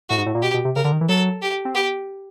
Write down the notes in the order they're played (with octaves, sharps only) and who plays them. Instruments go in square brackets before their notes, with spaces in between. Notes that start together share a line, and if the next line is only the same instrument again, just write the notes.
[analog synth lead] A2 [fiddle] F#4
[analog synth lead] G#2
A2
A#2
[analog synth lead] B2 [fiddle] G4
[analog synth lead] B2
C3
[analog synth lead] C#3 [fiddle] A#4
[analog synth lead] D3
D#3
E3
[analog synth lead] F#3 [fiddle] A4
[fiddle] G4
[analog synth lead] C4
[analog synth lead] B3 [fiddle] G4